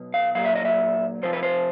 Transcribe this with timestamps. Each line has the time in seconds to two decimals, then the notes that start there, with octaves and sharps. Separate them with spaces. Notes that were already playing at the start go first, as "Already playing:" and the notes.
Already playing: B2 F#3
0.14 F5
0.35 A#2 F#3 F5
0.45 E5
0.56 D#5
0.65 E5
1.23 C3 F3 C5
1.33 B4
1.43 C5